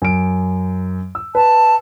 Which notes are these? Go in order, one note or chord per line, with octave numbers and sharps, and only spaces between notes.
F#2 D7
E6
B4 A5